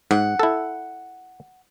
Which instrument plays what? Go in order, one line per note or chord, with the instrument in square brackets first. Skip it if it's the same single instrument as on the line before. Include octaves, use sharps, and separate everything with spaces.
[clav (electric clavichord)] G#2 [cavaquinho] F#5
[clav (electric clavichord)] E4 A4